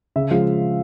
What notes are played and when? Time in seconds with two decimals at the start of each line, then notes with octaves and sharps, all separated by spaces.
0.16 C#3 E5
0.31 F3 G#3 F5